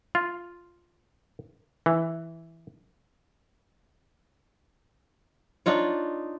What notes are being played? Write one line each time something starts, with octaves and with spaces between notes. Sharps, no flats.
F4
E3
D4 D#4 F4 C#5